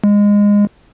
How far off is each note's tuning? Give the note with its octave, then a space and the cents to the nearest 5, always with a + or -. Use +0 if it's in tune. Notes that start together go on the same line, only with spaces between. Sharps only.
G#3 -20